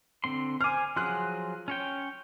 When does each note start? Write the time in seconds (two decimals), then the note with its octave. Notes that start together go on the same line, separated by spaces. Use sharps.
0.24 D3 C4 C6
0.61 C5 G#5 D6 F6
0.96 F3 F#3 G#4 C6 F#6
1.68 C#4 C#5 G5